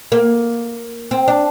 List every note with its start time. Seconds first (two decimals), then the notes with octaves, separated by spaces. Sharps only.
0.12 A#3
1.11 C4
1.28 D4